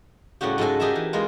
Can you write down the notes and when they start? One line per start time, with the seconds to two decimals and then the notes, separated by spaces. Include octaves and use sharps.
0.41 A2 C#3 G3 F#4 G4
0.58 G#2 F#3 G#3 A4 G#5
0.80 D#4 G4 G#4 A#4 E5 A5
0.95 E3
1.13 G#3 A#3 B3 F4